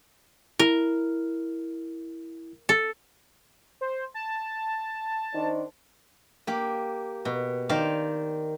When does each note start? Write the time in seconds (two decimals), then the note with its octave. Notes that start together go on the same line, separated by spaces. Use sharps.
0.59 E4 A#4
2.69 A4
3.81 C5
4.14 A5
5.35 D#3 D4 C5
6.47 A#3 G4
7.25 B2
7.69 D#3 C5 D5 F5